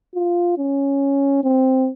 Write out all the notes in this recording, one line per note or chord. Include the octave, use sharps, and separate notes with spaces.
F4
C#4
C4